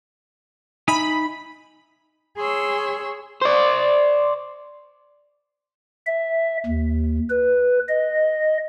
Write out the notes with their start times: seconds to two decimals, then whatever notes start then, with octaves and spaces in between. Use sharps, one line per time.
0.88 D#4 E5 G#5 B5
2.36 G#4 C#5 C6 E6
3.41 C5 D5
6.07 E5
6.66 D#2
7.30 B4
7.89 D#5